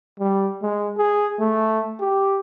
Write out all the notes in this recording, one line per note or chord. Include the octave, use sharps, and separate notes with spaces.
G3
G#3
G#4
A3
G4